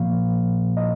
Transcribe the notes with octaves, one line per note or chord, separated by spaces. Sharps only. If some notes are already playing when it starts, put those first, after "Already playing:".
Already playing: A#2 F3 A#3 F5
D#5